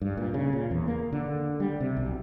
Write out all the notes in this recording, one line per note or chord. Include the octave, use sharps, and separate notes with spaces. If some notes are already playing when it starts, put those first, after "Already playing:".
G2
A#2
C#3
A#2
E2
A#3
D3
G3
C3
B1